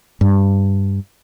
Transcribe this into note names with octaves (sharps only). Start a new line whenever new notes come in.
G2